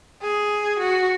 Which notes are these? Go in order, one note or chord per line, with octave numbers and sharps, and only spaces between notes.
G#4
F#4